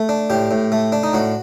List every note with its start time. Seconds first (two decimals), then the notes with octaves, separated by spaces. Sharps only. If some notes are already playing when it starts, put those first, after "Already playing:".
Already playing: A3
0.09 D4
0.30 A2 G4
0.51 A2
0.72 A3
0.92 D4
1.03 D#4
1.13 A2 F#4